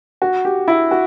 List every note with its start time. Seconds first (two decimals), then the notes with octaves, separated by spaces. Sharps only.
0.22 F#4
0.45 G4
0.68 E4
0.91 F#4